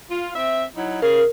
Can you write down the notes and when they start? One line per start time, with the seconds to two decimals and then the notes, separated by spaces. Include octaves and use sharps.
0.09 F4
0.35 C4 E5
0.76 F#3 D#4 E4
1.02 C#3 G#4 A#4 F5